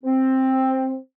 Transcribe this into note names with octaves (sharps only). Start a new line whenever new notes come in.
C4